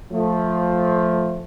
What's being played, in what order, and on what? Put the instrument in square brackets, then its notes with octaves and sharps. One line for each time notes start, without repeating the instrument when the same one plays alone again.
[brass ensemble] F3 A3